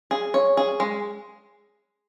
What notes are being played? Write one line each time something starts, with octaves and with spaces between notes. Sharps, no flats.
G#4
C#5
G#4
G#3